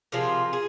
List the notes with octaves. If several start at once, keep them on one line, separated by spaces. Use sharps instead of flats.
C3 F3 G#3 F4 A#4
G#4